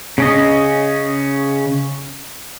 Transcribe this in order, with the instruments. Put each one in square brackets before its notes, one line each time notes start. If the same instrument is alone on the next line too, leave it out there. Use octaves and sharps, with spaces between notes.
[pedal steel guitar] C#3 C#4 D#5